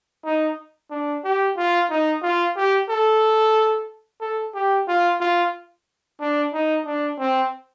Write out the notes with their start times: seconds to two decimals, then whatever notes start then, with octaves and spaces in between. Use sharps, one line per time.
0.24 D#4
0.91 D4
1.24 G4
1.57 F4
1.90 D#4
2.22 F4
2.56 G4
2.89 A4
4.21 A4
4.55 G4
4.88 F4
5.20 F4
6.20 D4
6.53 D#4
6.85 D4
7.19 C4